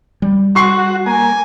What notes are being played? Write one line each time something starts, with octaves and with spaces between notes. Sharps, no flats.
G3
F#4 C6 C#6 C7
A#3 G#5